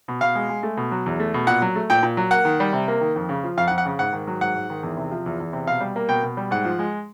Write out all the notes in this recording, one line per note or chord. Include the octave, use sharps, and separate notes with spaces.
B2
B2 F5
G#3
G#3
A3
B2
F#3
E2
A3
B2
A#2 F#5
F#3
A3
A#2 G5
A#2
F#3
A#3 F#5
D#3
G3
C3
A#3
D#3
F2
C#3
F3
F2 F5
F#5
F2
F#5
C#3
G#2 F#5
D#3
F#3
G#2 F#5
G#2
D#3
E2
C3
F3
E2
E2
C3
B2 F5
G3
A#3
B2 G5
B2
G3
G#2 F#5
F3
G#3